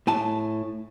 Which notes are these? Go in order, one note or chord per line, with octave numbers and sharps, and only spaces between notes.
A2 G#5 A5